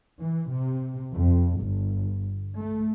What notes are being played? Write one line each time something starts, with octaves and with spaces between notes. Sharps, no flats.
E3
C3
F2
G1
A3